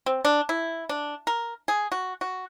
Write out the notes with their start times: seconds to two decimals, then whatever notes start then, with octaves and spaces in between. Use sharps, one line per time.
0.06 C4
0.25 D4
0.49 E4
0.89 D4
1.27 A#4
1.68 G#4
1.92 F#4
2.21 F#4